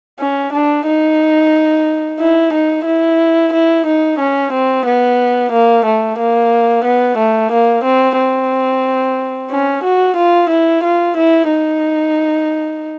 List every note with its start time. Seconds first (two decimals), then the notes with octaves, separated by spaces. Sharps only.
0.20 C#4
0.53 D4
0.86 D#4
2.20 E4
2.53 D#4
2.86 E4
3.53 E4
3.86 D#4
4.19 C#4
4.53 C4
4.85 B3
5.52 A#3
5.85 A3
6.19 A#3
6.84 B3
7.18 A3
7.52 A#3
7.84 C4
8.18 C4
9.51 C#4
9.84 F#4
10.17 F4
10.50 E4
10.84 F4
11.17 E4
11.50 D#4